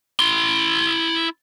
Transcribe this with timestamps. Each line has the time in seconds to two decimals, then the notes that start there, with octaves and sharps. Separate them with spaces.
0.19 E4 C6